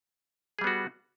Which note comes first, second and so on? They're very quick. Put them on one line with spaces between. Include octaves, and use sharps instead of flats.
G#4 G3 B3 F#4